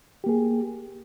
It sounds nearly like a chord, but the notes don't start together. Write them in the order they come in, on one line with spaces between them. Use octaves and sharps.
G4 A#3 G#4